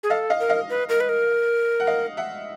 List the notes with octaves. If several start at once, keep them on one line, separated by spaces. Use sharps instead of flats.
G#4
A4 D#5 F5
D#5 F5
A#4
D#5 F5
B4
A#4
B4
A#4
F#5
D#5 F5
E5 F#5